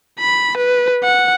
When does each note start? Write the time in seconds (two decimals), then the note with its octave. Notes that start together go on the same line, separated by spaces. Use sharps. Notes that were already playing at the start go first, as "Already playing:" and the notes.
0.20 B5
0.57 B4
1.03 F#5